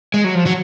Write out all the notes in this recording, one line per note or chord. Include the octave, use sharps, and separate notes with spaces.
G#3
F#3
F3
F#3